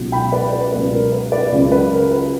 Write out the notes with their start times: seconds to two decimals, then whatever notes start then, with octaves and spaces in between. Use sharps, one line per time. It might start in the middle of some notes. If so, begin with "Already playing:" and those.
Already playing: C#2 B2 F#3
0.12 G5 B5
0.32 B4 D5
0.52 B4 D5
0.72 C#2 B2 F#3 B4
0.92 A#4
1.12 B4
1.32 B4 D5
1.52 C#2 C#3 F#3
1.72 B4
1.91 A#4
2.11 B4